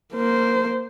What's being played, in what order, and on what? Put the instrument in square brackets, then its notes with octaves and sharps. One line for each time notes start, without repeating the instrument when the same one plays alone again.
[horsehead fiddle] A#3 C5